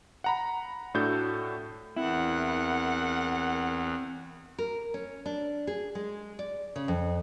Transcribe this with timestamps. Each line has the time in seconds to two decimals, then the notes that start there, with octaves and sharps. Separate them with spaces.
0.24 F#5 A#5 B5
0.94 A2 D4 F#4 A4 G6
1.96 E2 C4 E4 A#4 F#5
4.58 A#4
4.94 C#4
5.26 D4
5.67 G#4
5.95 G#3
6.39 D5
6.76 C#3
6.88 F2